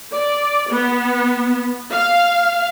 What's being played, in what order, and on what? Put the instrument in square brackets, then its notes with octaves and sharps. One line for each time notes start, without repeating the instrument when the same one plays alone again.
[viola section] D5
B3
F5